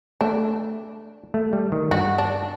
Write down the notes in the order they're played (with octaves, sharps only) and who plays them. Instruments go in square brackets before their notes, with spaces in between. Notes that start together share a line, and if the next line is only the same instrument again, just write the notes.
[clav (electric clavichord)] A3 [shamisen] D4
[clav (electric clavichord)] A3
G3
D#3
[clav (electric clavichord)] G2 [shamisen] F#4
[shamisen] D4